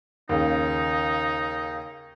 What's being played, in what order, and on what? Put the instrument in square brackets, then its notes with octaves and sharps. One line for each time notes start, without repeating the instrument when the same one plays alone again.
[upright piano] D#2 C#3 [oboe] D#4